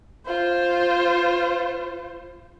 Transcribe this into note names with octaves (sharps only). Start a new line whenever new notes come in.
F4 C5